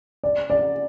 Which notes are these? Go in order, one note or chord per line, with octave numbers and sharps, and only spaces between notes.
D5
D5